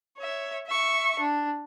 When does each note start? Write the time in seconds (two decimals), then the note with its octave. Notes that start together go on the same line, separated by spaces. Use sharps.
0.18 C#5 E5
0.67 E5 C#6
1.19 D4